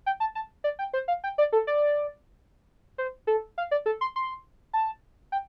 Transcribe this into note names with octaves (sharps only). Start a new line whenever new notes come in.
G5
A5
A5
D5
G5
C5
F5
G5
D5
A4
D5
C5
A4
F5
D5
A4
C6
C6
A5
G5